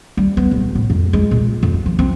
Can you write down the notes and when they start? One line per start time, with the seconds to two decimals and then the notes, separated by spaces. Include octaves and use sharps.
0.17 G3
0.37 B3
0.51 D#1
0.75 A2
0.90 F2
1.13 G#3
1.31 A#2
1.63 F2
1.74 F#2
1.86 F3
1.99 C4